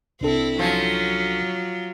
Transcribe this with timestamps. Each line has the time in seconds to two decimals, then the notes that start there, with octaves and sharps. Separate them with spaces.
0.21 C2 C4 D4 E4 A4
0.59 F3 F#3 C#4